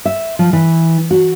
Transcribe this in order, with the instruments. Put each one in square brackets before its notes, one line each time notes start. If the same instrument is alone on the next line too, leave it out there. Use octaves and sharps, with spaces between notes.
[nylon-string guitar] E5
F3
E3
F#4